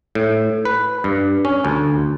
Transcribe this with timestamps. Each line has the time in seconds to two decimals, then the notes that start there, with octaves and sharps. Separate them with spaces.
0.15 A2
0.65 B4
1.04 G2
1.45 C#4
1.65 D2